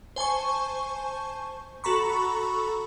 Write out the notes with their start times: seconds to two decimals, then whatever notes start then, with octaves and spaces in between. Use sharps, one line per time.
0.16 C5 G#5 A5 C#6
1.84 F#4 A4 A#5 B5 C#6